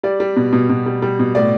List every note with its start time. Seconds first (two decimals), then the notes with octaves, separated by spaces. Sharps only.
0.03 G3 D5
0.20 G3
0.36 B2
0.53 B2
0.70 B2
0.86 G3
1.02 G3
1.19 B2
1.35 A2 D5